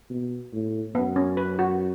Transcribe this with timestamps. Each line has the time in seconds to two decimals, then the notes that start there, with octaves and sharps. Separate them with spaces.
0.10 B2
0.53 A2
0.95 F#2 B3
1.16 C#4
1.37 B4
1.59 F#4